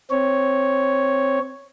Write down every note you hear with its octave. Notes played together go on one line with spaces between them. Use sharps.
C4 C#5